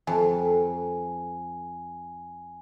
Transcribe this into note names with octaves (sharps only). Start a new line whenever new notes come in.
F2 G#5